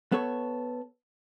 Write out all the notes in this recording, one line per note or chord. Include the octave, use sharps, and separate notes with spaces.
B3 A4 C#5